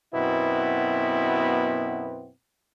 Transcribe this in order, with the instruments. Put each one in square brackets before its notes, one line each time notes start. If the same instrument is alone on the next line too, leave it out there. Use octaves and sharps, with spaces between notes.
[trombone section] F#2 B2 B3 C4 E4